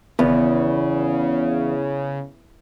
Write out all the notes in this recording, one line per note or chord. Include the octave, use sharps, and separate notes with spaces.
G#1 E2 C#3 B3